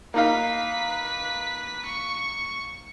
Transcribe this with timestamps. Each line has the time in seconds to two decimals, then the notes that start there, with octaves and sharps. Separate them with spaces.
0.14 A#3 D#4 B4 F5 B6
1.85 C#6